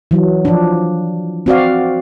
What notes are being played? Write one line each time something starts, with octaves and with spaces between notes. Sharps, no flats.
E3 F#3
F3 D4
C4 F#4 D5 F5